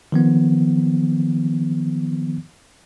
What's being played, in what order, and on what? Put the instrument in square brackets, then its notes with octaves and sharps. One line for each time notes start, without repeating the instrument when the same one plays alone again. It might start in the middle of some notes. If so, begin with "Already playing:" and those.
[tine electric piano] D#3 F3 B3